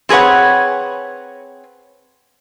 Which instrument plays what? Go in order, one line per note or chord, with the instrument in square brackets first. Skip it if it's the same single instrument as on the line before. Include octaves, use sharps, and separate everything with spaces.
[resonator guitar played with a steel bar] C4 G#4 B4 C#5 F#5